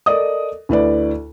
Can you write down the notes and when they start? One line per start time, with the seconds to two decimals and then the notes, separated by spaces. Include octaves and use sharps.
0.06 A4 A#4 D5 D#5 D#6
0.69 D2 E4 B4 D5